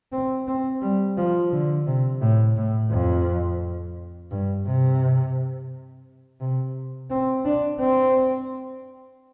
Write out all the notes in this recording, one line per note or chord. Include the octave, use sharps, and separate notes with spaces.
C4
C4
G3
F3
D3
C3
A2
A2
F2
G2
C3
C3
C4
D4
C4